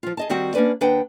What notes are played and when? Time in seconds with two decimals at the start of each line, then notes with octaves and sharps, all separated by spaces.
0.03 F3 F4
0.17 G#4 D#5 A5
0.29 D#3 G3 C4 F#4 F#5
0.54 A#3 C#4 D4 B4 D5
0.81 D#2 D4 B4 F#5 G5